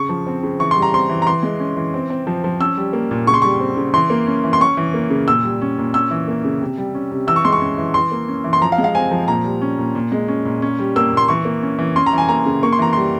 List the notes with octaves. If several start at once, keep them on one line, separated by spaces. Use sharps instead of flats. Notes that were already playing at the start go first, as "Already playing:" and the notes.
Already playing: C#3 C#6
F3
C4
C#3
E3 C#6
G3 C6
A#5
C4 C6
E3
A#5
E3 C6
G#3
C#4
E3
C4
C4
F3
F3
C#4 E6
G3
A#3
A#2
C#3 C#6
C6
G3 C#6
C4
C#3
E3 C6
A#3
C#4
E3
C6
C#4 C#6
E3
A#3
C#3
A#2 E6
G3
C#4
A#2
C#4 E6
E3
A#3
C#3
C3
G3
C#4
C3
E3 E6
C#6
G#3 C6
C#6
C#4
E3
E3 C6
A#3
C#4
E3
C6
F3 A#5
F5
G#3
F5
C4 G#5
F3
A#2 A#5
G3
C#4
A#2
A#2
G#3
C#4
A#2
C#4
G3
A#3 E6
A#2
C6
E3 C#6
A#3
C#4
E3
C#4 C6
A#5
E3 G#5
A#3 A#5
C#3
A#3 C#6
C6
E3 A#5
G3 C6